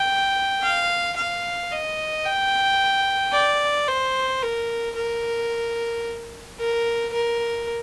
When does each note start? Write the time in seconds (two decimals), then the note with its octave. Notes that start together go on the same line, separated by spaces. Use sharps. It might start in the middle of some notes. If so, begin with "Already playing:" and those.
Already playing: G5
0.62 F5
1.16 F5
1.72 D#5
2.25 G5
3.33 D5
3.88 C5
4.43 A#4
4.96 A#4
6.59 A#4
7.13 A#4